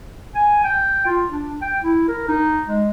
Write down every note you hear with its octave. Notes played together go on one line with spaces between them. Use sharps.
G#5
G5
F4
D4
G5
E4
A#4
D#4
G#3